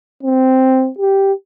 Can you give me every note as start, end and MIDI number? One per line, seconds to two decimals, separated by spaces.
0.23 0.90 60
0.99 1.33 67